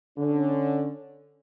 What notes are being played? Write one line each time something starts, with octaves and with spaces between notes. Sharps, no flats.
D3 C#4